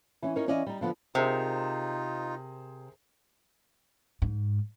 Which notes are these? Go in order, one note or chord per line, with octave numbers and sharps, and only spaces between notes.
E3 C#4
C#4 D#4 A#4 C#5
E3 C#4 D5 D#5 F5
G3 D#4
D3 F3 B3
C3 D#4 F4 G#4 A#4 C5
G#2